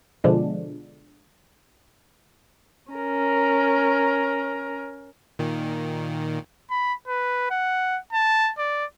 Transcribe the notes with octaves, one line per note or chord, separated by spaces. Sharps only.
B2 D3 F3 G#3 D4
C#4 A#4
A#2 D#3
B5
B4
F#5
A5
D5